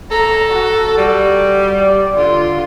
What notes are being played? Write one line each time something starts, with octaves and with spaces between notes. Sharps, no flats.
A4 A#5
F#4
G3
D5
D3 F4